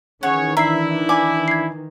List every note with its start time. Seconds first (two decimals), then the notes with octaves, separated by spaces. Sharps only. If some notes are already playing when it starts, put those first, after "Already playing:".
0.23 D#3 E3 C#4 G#4 C#5 F#5 G#5
0.57 D4 E4 E5 A#5 C7
1.09 D5 G#5 D6
1.48 G#6 C7